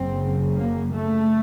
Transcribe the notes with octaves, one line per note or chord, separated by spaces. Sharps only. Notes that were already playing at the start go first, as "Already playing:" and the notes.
Already playing: F#1 F#2 C#3 C4
A#3
A3